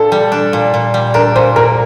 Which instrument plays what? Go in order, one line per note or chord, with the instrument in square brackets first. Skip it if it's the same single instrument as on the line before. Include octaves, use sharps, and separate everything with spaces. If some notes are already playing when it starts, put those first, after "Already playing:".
Already playing: [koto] A#2 D4 [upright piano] A4
[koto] G3
D4
A#2
A#2
G3
[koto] D4 [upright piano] A#4
[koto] A#2 [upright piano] C5
[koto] A#2 [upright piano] A#4